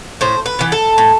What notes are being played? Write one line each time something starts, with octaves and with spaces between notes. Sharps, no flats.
A2 C5
B4
E3 B3
A4
A2